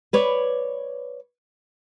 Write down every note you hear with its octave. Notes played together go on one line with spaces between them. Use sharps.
B4 C#5 D5